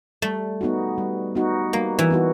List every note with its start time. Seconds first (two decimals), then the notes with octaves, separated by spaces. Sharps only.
0.22 G3 A3
0.61 B3 D#4 F#4
0.98 G3
1.35 B3 D#4 F#4
1.73 G3 A#3
1.99 E3
2.10 B3 D#4 F#4